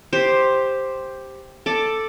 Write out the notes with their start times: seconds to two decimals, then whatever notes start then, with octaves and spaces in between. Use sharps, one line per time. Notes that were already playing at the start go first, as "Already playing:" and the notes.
0.13 G4 C5
1.66 A4 D5